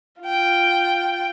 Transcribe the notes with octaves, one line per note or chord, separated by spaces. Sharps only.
F4 G5